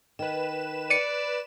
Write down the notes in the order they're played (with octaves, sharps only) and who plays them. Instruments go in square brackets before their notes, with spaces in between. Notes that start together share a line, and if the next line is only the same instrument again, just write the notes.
[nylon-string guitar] D#3 [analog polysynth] B4 E7
[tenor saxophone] D5 [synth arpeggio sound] C#7 D#7